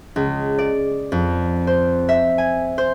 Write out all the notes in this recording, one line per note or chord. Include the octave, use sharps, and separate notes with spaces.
C#2
D5
F2
C5
E5
G#5
C5